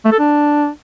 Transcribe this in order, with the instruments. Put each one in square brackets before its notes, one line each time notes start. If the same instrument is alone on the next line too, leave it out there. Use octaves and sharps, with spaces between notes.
[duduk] A3
A4
D4